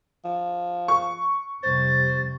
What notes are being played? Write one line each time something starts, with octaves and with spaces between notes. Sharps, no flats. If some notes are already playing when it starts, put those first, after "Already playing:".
F3
C#6
F2 C3 G3 C5 A6